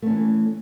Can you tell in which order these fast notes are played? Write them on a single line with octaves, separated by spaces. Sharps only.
A3 C#4 E3